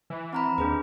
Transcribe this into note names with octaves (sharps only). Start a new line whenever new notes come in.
E3
C4 A#5 B5
D#2 D4 G#4 B4